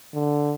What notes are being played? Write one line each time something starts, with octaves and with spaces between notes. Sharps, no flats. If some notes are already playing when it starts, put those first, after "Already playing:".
D3